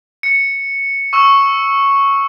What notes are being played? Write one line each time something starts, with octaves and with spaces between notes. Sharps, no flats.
C#7
C#6 E6 E7